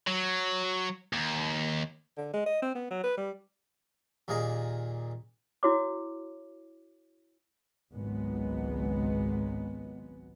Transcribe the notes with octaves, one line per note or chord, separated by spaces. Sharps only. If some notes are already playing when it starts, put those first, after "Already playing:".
F#3
D#2
D3
G#3
D#5
C4
B3
F#3
B4
G3
D#2 A#2 A#3 G#4 D#5 A#5
E4 F#4 C#5 D6
G#1 C#2 G#2 F#3 G#3 B3